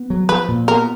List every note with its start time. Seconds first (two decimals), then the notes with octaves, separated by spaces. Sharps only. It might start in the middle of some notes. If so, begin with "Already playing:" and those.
Already playing: B3
0.10 F#3
0.29 F3 B4
0.48 A#2
0.68 B3 A#4